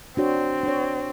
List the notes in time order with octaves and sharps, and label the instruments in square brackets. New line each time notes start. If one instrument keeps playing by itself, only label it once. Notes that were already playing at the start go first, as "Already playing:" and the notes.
[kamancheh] C4 [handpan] D4 F#4 C#5
[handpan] D4 C#5